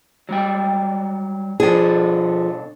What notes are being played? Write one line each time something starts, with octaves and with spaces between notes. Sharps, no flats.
F#3 G3 G5
B2 F3 D4 G#4 A4